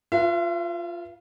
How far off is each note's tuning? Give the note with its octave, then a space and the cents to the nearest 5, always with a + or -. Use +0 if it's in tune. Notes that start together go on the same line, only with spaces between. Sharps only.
F4 +0 B4 -30 E5 +45